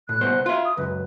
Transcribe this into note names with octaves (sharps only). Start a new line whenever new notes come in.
A2 F#6
C2 B3 C5
F4 E5 C6
D#6
C#2 F#2 B4